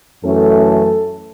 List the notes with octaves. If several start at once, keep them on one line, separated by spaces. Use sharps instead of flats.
F#2 E3 A3 C#4 A4